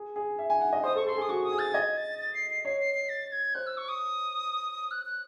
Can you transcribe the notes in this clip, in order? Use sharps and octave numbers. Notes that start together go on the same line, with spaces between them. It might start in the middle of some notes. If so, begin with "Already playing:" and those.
Already playing: G#4
G#4
E5
G#5
F#5
D#5
C5 D#6
A4 C#6
A4 C6
G#4 D#6
F#4 C#6
D#6
G#4
A6
D#5 G#6
A6
A6
C7
C7
C#5 C7
C7
C7
A6
G#6
C5 F#6
E6
C#6
D#6
F#6
F#6